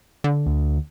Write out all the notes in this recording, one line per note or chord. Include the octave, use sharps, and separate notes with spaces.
D3
D2